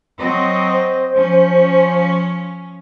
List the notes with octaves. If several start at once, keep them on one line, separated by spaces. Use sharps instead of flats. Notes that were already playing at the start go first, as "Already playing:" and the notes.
F#3 C4 D#5
C5
F3 C#4